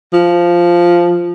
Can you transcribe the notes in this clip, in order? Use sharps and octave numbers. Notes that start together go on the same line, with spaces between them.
F3